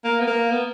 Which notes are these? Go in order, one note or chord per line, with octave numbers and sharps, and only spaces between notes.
A#3
B3
A#3
B3